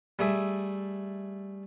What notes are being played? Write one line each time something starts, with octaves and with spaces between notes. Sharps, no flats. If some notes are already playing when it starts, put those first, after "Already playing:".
G3 A3 G#4 E5